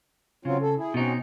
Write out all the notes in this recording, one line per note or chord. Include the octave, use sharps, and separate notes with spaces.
C#3 F#3 C4 F4
A4
E4 G#4
B2 C4 C#4 D#4 F#4